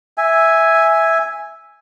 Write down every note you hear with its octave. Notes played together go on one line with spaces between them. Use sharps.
E5 G#5